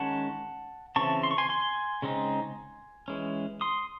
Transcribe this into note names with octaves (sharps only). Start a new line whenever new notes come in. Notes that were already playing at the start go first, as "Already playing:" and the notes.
Already playing: D#3 G#3 C#4 F#5 A5
C#3 E3 C4 E4 A5 C#6
C6
C#6
G#5 C6
G#5 C6
C#3 G#3 C4 D#4
E3 G#3 C#4
C6 D#6